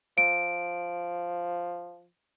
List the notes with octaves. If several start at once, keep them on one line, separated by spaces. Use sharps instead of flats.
F3 D7